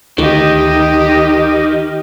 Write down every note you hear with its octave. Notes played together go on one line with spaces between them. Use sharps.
D2 D#3 G4 D#5